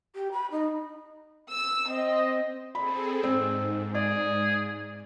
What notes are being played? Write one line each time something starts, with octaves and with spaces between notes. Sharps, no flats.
G4
B5
D#4
E6
C4 D#5
C4 G#4 A4 B5
G#2 C4
G#4 D5